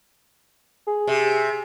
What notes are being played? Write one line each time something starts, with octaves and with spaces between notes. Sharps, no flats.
G#4
C3